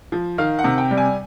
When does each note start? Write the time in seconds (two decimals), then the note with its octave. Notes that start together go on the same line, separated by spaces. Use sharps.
0.12 F3
0.38 D#3 F5
0.59 F#5
0.64 C3
0.78 G5
0.91 G3
0.98 G#5